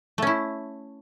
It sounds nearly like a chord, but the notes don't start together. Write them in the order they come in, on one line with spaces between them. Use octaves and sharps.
A3 C#4 E4